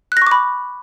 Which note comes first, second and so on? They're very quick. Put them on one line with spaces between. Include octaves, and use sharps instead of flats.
F#6 A#6 C#6 D6 B5